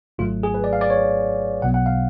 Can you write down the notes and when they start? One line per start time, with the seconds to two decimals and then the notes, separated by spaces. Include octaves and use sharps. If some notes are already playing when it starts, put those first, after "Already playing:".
0.19 G#1 G#2 F#3 A3 F4
0.43 G#4
0.54 B4
0.64 D5
0.73 F5
0.81 D5
0.90 C#5
1.62 B1 B2 F#3 B3 F#5
1.74 F#5
1.86 F5